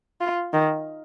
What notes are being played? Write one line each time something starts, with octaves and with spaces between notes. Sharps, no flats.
F4
D#3